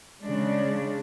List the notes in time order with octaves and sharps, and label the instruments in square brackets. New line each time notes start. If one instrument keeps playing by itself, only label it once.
[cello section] C#3 G#3 D4